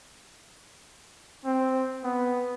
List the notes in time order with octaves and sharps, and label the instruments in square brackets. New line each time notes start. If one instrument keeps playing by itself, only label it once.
[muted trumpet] C4
B3